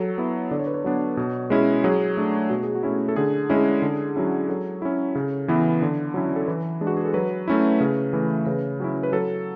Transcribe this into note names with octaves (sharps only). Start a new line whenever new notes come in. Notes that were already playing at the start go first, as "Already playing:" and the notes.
Already playing: F#3 A4
B3 E4
D3 D5
C#5
B4
C#5
F#3 B3 D4
B2
G#3 C#4 E4
F#3 G#4
A3 D4
B2 F#4
G#4
F#4
A3 C#4 E4
A4
D3 G#4
G#3 C#4 E4
D3
F#3 C#4 E4
F#3 A4
C#4 E4
C#3
E3 B3 E4
D3
F#3 C#4 E4
A4
E3 B4
G#3 D4
F#4
G#4
A4
F#3 B4
A3 C#4 E4
C#3
E3 A3 E4
C#3 B4
F#3 C#4 E4
B4
F#3 A4